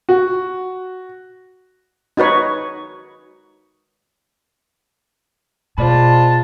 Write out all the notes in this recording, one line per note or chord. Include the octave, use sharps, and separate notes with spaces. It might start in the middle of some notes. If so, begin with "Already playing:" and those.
F#4
D#4 F#4 B4 C#5
B2 G#3 F4 C5 D5 A5 B5